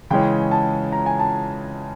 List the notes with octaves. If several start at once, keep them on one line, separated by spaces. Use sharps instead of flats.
C#3 E3 G#3 C#4 G5
A5
A#5
G#5
A5